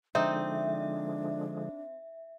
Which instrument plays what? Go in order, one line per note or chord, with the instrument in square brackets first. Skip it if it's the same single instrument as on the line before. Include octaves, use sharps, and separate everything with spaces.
[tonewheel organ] D3 F3 G#3 [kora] C4 D#4 [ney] D4 [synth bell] E5